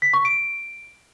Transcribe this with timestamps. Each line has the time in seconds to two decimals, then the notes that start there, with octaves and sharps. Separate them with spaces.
0.02 B6
0.14 C#6
0.25 D7